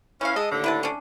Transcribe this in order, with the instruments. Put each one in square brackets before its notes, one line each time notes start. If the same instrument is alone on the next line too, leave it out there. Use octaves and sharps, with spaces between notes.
[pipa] E3 F5 [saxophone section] C#4
[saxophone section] G#3 D#5 [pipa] A4
[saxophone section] D#2 A2 D3
[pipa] E4 B4 A5
C#4 D4